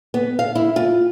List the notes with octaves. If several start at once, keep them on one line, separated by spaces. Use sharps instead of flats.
B3
F5
E4
F4